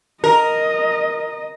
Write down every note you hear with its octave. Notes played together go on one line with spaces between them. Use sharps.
A#4 D#5